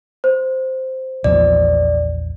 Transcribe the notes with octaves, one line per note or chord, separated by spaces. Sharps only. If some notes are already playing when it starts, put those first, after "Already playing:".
C5
A#1 E2 F3 D5